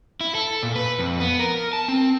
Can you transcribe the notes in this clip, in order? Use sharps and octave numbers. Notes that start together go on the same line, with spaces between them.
E4
A4
A#2
B4
F2
B3
A#4
A5
C4